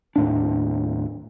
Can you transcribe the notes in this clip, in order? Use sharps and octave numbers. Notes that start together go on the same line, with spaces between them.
D#2 A2 D4